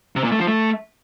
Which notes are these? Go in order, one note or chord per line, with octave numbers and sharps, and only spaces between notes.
C3
A#2
A3
F3
A3